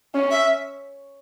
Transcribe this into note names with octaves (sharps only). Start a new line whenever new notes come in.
C#4
E5